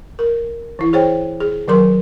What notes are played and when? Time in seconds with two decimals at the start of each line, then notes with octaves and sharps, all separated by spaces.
0.19 A#4
0.79 E3 E4
0.93 G#4 C5 C#5 G5
1.40 G#4
1.68 D#3 F#3 A#4 C6